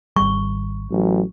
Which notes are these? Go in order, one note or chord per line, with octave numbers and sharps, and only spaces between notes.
G#1 G3 C#6
A1 F#3